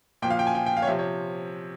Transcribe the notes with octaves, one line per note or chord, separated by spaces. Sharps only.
A#2 F3 G5
F5
G5
G#5
G5
G5
F5
C#5
C3 F3 E5
C#5